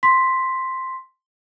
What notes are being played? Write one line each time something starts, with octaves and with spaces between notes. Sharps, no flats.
C6 B6